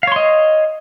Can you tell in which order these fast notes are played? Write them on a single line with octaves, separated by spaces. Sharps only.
F5 C#5 C6 D#5